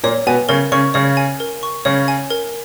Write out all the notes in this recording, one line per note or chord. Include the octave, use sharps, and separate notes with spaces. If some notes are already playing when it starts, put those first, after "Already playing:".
A#2 A#3 C#5
B2 B3 G#5
C#3 C#4 A#4
C#3 C#4 C#6
C#3 C#4 C#5
G#5
A#4
C#6
C#3 C#4 C#5
G#5
A#4